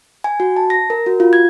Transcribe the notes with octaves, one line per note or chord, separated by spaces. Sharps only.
G#5
F#4
A5
A#6
A#4
F#4
F4
G#6